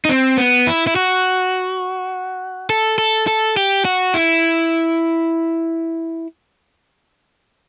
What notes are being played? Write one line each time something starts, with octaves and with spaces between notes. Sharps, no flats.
D#4
C4
B3
E4
E4
F#4
A4
A4
A4
G4
F#4
E4